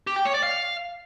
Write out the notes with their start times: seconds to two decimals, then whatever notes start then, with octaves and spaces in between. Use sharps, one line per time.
0.07 G4
0.16 G5
0.25 C#5
0.34 D5
0.43 F5